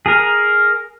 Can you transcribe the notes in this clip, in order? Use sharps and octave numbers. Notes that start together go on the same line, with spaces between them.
G#4 A#4